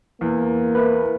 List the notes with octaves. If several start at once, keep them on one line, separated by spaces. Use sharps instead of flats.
E2 A#3
E4 A#4 B4